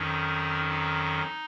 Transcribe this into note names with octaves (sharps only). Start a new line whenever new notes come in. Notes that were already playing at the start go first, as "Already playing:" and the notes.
Already playing: F2 D#3 F#3 C#4 D#4
D#4